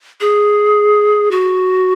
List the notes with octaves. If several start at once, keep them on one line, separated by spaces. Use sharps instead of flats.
G#4
F#4